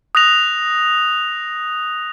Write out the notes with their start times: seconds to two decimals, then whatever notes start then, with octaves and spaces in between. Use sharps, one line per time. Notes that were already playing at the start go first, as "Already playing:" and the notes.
0.15 D#6 F#6 A#6 F7